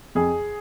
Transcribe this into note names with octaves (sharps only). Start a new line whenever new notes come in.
F2 G#4